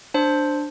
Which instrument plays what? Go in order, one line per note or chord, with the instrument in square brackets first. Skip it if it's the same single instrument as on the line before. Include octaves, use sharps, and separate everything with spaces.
[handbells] D4 C5